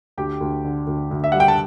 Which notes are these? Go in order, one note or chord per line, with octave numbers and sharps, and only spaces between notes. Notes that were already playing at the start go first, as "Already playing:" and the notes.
D2 G4 G5
D2
D3
D2
D2
E5
G3 F#5
G5
A5